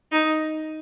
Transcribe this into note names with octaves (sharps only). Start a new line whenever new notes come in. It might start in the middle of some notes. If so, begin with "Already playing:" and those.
D#4